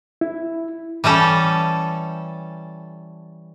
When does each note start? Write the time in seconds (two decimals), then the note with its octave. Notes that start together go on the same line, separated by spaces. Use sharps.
0.21 E4
1.04 E3 G3 C#4 A4